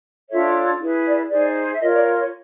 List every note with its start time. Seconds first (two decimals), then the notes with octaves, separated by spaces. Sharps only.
0.30 D4 F4 A4 C#5 E5
0.81 E4 G#4 B4
1.05 D5
1.30 D#4 G#4 C5 D5
1.73 E5
1.81 F4 A#4 C#5 D#5
1.94 D5
2.19 C#5